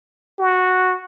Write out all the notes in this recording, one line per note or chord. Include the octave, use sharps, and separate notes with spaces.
F#4